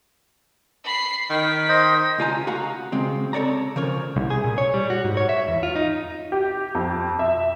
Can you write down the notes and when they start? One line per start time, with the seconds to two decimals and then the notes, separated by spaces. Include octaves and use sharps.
0.84 B5 C7
1.30 D#3 B6
1.69 C5 D#5
2.18 C#2 F4 G#5 A#5
2.47 F#4 F5 A#5
2.92 C#3 G#3 C4
3.33 A4 C#5 D5 A#5
3.76 C#3 F3 A#4 C#5
4.17 C2
4.30 G#4
4.44 A#2
4.58 C#5
4.74 G3
4.90 F#4
5.05 G#2
5.17 C#5
5.29 E5
5.48 E2
5.63 F4
5.76 D#4
6.32 G4
6.75 F2
7.19 E5